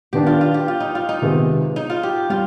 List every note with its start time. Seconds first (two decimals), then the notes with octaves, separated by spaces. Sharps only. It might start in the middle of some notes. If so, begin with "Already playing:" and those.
0.13 D#3 B3 D4 G4
0.26 F4
0.41 F4
0.54 G4
0.68 F4
0.80 D#4
0.95 F4
1.09 D#4
1.22 C3 D#3 G#3 B3
1.76 D#4
1.90 F4
2.03 G4
2.30 G3 F4